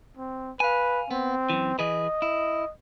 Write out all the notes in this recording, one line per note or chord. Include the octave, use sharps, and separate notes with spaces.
C4
B4 F5 G#5
B3 C4
F#2 E3
E3 G#4 B4 D#5
E4